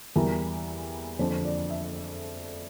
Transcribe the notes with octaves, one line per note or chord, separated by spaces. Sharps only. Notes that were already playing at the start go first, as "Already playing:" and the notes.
E2 E3 G3 A#4
F2 D3 F3 C5
D5
E5